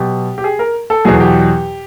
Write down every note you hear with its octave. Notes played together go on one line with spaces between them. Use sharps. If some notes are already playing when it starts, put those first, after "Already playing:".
Already playing: B2 F#3 G4
G4
G#4
A#4
A4
E2 B2 F#3 G#4
G4